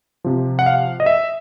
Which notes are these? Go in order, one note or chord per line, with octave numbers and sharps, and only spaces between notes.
C3 F3
F#5
F5
D#5
E5